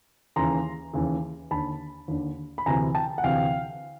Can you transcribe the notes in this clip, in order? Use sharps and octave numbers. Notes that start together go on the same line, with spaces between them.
D#2 C#3 E3 A#5 C6
D#2 C#3 E3
D#2 D3 A5 B5
D#2 D3
B5
D2 C3 E3 G#5 A#5
G5 A5
F#5
D2 C3 E3 F5 G5